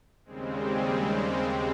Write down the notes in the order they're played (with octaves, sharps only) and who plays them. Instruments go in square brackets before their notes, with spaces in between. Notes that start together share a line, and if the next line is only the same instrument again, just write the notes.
[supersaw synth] D#2 C#3 G3 G#3 C4